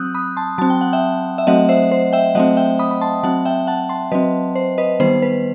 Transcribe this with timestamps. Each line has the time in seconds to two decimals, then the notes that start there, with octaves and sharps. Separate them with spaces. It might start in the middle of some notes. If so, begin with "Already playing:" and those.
Already playing: F#3 C4 D#6 E6 F#6 G6
0.15 B5 D#6
0.37 A5 C6
0.58 F#3 C4 A5
0.70 G5
0.81 F#5
0.93 E5 G5
1.38 E5
1.47 F#3 A3 C4 D#5 F#5
1.69 C5 E5
1.92 C5
2.13 E5 G5
2.35 F#3 A3 C4 D#5 F#5
2.57 E5 G5
2.79 B5 D#6
2.91 B5
3.01 A5 C6
3.23 F#3 C4 F#5 A5
3.45 E5 G5
3.67 F#5 A5
3.89 A5 C6
4.12 F#3 C4 B4 D#5
4.55 C5
4.78 B4 D#5
5.00 D#3 G3 B3 C5
5.22 B4